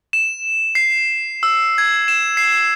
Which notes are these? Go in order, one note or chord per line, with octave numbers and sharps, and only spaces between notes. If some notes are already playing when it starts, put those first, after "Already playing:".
E7
C7
E6
G#6
E7
C7